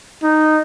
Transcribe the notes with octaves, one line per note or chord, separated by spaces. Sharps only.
D#4